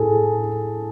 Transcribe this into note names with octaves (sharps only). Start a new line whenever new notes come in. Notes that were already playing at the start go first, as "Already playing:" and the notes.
Already playing: A2 G#4 A4